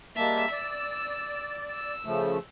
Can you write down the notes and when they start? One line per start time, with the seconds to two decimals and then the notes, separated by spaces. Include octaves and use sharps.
0.16 G3 G#3 A#3 E5 A5
0.52 D5 E6
1.70 E6
2.05 C#3 F3 A3